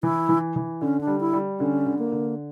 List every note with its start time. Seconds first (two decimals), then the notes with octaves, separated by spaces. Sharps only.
0.03 E3 E4
0.29 E3
0.56 E3
0.81 D3 C#4
1.01 D4
1.07 G3
1.20 E4
1.33 G3
1.59 D3 C#4
1.86 D3
1.99 A#3
2.12 D3